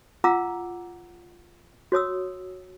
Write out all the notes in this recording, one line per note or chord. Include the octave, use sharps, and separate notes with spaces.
F4 F5 F#5 A#5 D6 E6
F#4 C#5 D#6 E6